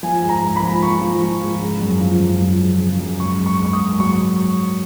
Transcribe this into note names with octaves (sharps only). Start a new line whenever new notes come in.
F3 G#5
G#2
A#5
G#2
B5
F3
F3 C#6
F3
F3
G#2
C#3
F#2
F3
F#2
F3
C#3
C#3
F#2
G#2 C#6
G#2
C#6
G#2 C#6
D#6
G#2
F#3 C#6